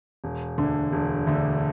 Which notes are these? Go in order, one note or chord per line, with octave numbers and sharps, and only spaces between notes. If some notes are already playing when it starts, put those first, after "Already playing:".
E1
D2 D3
E1
D2 D3